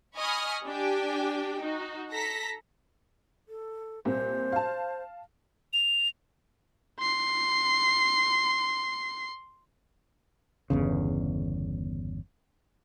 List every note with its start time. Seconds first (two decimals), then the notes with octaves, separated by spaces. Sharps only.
0.16 D#5 G#5 B5 C#6 D#6 F6
0.65 D4 G4 G5 G#5
1.61 D#4 F#4
2.10 A4 A#5 A#6 B6
3.49 A4
4.05 C2 A#2 C5
4.52 F5 A5
5.73 F7
6.99 C6 C7
10.70 G1 E2 C#3